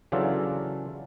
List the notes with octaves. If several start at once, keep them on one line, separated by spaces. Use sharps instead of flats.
C#3 E3 F#3 D4 F4 A4